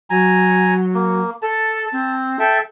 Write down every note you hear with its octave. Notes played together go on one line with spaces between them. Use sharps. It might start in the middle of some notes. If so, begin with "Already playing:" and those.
F#3 G#5 A#5
A#3
A4 A5
C4
A4 E5 G5 A5